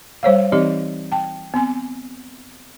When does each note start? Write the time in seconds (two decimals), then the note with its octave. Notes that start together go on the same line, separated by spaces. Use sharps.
0.23 G3 C5 C#5 F5
0.52 E3 C4 D#4 G4 D5
1.12 G5 A5
1.54 B3 C4 G#5